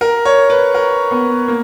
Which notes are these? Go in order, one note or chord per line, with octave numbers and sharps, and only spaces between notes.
A#4
C#5
B4
A#4
B3
A#3